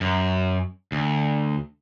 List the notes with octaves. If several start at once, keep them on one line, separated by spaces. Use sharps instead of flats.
F#2
D2